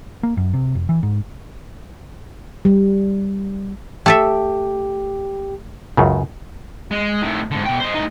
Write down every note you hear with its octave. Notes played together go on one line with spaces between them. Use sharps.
A#3
F#2
C3
F1
E3
G#2
G3
A3 G4 A4 E5
C#2 F#2 C#3
G#3
A2 D#3
G#2 D3
B2 G5
C5 D#5
A2 D#4